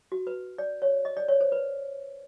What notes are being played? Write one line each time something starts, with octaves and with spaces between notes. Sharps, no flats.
F#4
B4
D5
C#5
D#5
D5
C#5
C5
B4